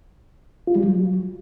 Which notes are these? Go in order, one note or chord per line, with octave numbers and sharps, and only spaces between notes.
F4
G3
F#3